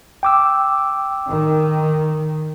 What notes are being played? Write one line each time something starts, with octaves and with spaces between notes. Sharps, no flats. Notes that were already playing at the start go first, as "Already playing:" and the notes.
G5 D6 E6
D#3